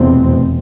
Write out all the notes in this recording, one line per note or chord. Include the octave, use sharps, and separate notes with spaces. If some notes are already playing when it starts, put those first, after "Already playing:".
Already playing: F1 E2 B2 A3 C4